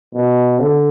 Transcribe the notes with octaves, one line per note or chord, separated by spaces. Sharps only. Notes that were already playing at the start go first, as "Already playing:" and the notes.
B2
D3